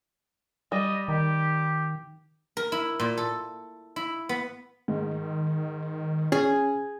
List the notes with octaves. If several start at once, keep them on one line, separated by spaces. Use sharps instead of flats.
G3 D#5
D#3 G4
A#4
E4
A#2
A4
E4
B3
G#2 D#3
C#4 G#4